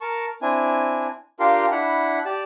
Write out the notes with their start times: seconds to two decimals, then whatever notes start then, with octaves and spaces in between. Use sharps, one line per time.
0.01 A#4 A5 C#6
0.42 C4 D4 E4 G#5
1.40 D4 F4 G4 A#4 F5 C6
1.71 D4 E4 F#5 B5
2.25 G4 D5 A5